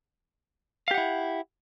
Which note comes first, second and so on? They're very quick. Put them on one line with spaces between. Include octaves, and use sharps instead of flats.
F5 G4 F#5 E4